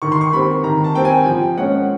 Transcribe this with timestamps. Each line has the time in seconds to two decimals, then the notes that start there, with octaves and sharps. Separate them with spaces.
0.02 D#3 C#6
0.12 C6
0.21 C#6
0.33 G3 C4 B5
0.64 D#3 A#5
0.84 A5
0.95 G3 C4 G5
1.05 G#5
1.26 F3 G5
1.57 G#3 C#4 F#5